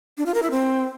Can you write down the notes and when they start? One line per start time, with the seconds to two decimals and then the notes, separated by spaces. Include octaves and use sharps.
0.17 D4
0.26 F4
0.34 A#4
0.42 E4
0.51 C4